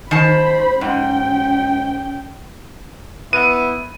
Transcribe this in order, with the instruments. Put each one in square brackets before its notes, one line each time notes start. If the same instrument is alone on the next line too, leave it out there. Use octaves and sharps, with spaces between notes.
[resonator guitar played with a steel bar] D#3 A5 [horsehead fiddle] C5 B5
[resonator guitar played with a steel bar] G#2 [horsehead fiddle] C#4 G5
[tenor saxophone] B3 [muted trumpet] E4 [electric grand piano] D#7